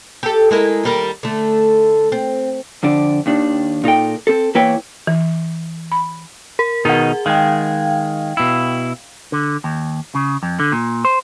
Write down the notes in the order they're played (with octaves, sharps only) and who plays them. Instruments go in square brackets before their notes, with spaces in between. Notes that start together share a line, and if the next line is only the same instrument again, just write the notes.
[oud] G4 A4
G#3 E4 A#4
D#2 G3 A#4
D3 A3
C4
[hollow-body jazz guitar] F2 D3 D4
D#2 D#3 D4
A#2 D#4 A4 G5
C4 A4
E2 A#3 E4 B4 C#5 G5
[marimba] E3
B5
[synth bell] A#4
[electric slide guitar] B2 D#3 D#4 [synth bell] G#4 F#5
[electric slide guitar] D#3 G#3 [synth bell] F5 G5
[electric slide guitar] B2 E4
[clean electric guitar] D3
D#2
C#3
F2
D3
A#2
C5